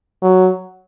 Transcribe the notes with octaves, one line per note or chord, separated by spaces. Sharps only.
F#3